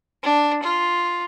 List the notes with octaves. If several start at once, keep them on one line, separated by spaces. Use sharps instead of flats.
D4
F4